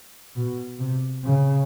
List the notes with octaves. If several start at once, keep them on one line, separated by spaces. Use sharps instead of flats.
B2
C3
C#3